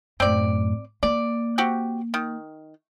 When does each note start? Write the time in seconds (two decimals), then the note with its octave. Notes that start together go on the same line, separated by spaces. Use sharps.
0.20 F#2 A2 C4 D5
1.03 A#3 D5
1.58 C4 F#4 G4
2.14 D#3